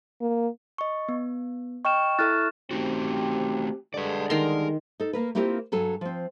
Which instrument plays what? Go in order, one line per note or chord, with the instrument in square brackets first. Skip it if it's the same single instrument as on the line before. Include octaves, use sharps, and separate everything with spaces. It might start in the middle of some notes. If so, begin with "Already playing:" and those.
[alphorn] A#3
[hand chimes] D#5 C#6
B3
[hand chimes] D#5 G5 F6 [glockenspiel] C#6 E7
[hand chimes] E4 A4 E5 [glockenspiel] F6 F#6 A6
[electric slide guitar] A3 D#4 F#4 [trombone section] C4 G4
[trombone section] D3 G3 G#3 [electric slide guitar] B4 D5
[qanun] D#3 C6 [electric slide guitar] A#4
[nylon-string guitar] D#4 A4
A#3 A#4 B4
A#3 C4 E4 F4 G4 A#4
G2 F#3 A4 G#5
F3 C4